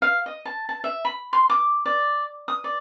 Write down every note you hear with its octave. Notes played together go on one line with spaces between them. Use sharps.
F5
D#5
A5
A5
E5
B5
C6
D6
D5
D#6
D5